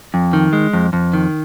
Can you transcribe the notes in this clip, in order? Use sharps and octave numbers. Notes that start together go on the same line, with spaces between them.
F2
D#3
G#3
F2
F2
D#3